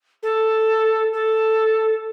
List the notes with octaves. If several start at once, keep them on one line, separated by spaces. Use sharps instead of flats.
A4
A4